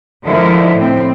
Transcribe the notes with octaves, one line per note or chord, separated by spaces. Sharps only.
D3 D#3 F3 G#3 D4 E4
A2 C4